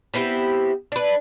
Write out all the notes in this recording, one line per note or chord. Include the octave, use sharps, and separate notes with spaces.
B3 C4 E4 G4
D4 B4